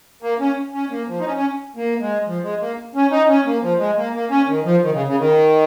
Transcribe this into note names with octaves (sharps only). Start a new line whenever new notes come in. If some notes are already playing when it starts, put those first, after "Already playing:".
A#3
C#4
C#4
A#3
F3
D#4
C#4
C#4
A#3
G#3
F3
G#3
A#3
C#4
D#4
C#4
A#3
F3
G#3
A#3
A#3
C#4
D#3
F3
D#3
C#3
C#3
D#3